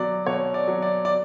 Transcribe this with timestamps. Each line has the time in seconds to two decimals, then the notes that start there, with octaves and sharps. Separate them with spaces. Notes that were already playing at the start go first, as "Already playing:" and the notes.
Already playing: B2 F#3 D5
0.26 B2 C#5
0.54 D5
0.68 F#3
0.82 D5
1.05 D5